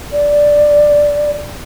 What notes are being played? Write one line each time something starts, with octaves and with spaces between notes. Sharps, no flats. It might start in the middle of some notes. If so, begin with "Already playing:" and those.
D5